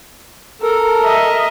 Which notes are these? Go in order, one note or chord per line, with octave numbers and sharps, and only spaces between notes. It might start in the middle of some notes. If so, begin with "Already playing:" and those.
A4 A#4
D#5 E5